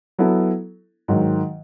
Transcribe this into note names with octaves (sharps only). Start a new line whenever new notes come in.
F#3 B3 E4 A4
G#2 D#3 F#3